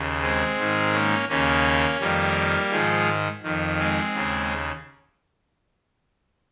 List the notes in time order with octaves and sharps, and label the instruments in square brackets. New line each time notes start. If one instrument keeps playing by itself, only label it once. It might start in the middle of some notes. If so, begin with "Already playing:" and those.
Already playing: [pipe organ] D#2 C#3
G#3 C4
G#2 D#3
A#3 C#4
D#2 C#3 A#3 C#4
F2 D#3 G3 A#3
G#2 D#3 F3 G#3
F2 D#3
G#3 C4
D#2 C#3